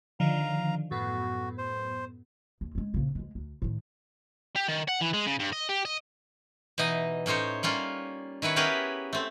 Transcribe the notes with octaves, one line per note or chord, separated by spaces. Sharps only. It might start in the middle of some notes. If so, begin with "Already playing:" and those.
D3 D#3 F3 F5 A#5
F#2 A2 B3 F#4
C5
D#2
G#3 C#4
A#1 C#3
D2 G#3
D2
A2 D#3
G4
D#3
F#5
E3
G#3
C#3
G2
D#5
G4
D#5
B2 E3 D#4 D#5
A2 C#4 D#4 C5 C#5
G3 A#3 C#4 F4
D#3 E4 B4 C#5
B3 C#4 G4 G#4 A#4 B4
A3 C4